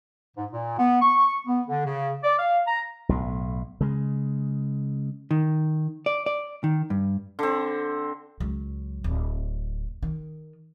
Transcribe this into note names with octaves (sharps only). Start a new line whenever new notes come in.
G#2
A#2
B3
C#6
B3
D3
C#3
D5
F5
A#5
B1 A2
C#3 G#3
D#3
D5
D5
D#3
G2
D3 C4
C#2 F#3
D1
D#3